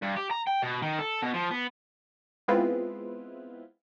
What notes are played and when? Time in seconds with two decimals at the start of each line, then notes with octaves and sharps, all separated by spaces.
0.02 G2
0.16 G4
0.30 A#5
0.47 G5
0.62 B2
0.82 D#3
0.99 A4
1.23 B2
1.34 F3
1.51 B3
2.48 G#3 B3 C4 E4 F4 B4